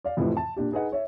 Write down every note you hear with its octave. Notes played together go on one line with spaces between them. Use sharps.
D5 F5
F2 A2 C3 E3 F3
A5
A#2 D4 G4
D#4 G#4 B4 D#5 F#5
C#5 E5